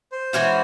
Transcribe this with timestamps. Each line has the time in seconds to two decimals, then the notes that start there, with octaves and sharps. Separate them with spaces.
0.12 C5
0.33 E3 G#3 C#4 F#4